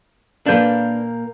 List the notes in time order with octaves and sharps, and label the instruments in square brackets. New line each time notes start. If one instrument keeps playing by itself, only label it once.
[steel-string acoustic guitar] A#2 A#3 [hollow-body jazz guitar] D4 B4 [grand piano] F5 G6